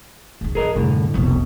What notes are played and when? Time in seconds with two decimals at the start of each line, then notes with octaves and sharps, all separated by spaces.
0.41 C#2 G#2
0.55 E3 G#4 A#4 D#5
0.75 C2 F#2 A2 D3
1.14 D#1 C2 F2 B2